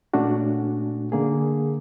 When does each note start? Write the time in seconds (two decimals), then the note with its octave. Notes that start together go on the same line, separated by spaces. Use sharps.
0.14 A#2 A3 C#4 D4 F#4
1.12 D3 A#3 G#4